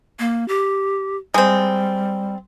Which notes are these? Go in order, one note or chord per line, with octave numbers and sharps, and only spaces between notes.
A#3
G4
G3 G#3 C4